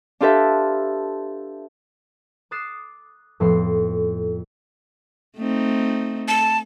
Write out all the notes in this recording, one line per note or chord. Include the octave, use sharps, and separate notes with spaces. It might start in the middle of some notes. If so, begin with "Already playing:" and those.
D4 F4 G4 A4 B4 E5
D6 D#6 F#6 A6 C7 E7
F2 A2 F3 B3 C6
A3 C4 D#4
A5